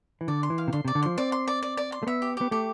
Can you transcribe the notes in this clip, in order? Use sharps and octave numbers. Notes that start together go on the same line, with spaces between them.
E3
D3 D5
C6
E3
F5
C3
D3 C6
C3 D5
D3
F3 C6
C4 D5
C6
D5
D5
D5
C6
A3
B3 E5
G4
B3 G4
A3 G4